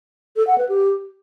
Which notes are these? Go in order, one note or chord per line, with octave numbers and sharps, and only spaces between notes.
A4
F#5
B4
G4